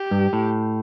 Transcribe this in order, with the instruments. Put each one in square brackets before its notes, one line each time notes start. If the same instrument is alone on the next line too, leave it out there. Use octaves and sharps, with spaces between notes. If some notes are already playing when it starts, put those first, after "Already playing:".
Already playing: [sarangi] G4
[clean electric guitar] G2
A2